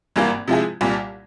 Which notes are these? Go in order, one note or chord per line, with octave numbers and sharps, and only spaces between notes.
G#1 G2 E3 A#3
C3 F3 G#3 E4 G#4
C2 A#2 G3